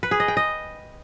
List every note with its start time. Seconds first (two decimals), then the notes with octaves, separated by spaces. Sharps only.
0.03 B4
0.11 G#4
0.20 D#5
0.28 G5
0.37 D#5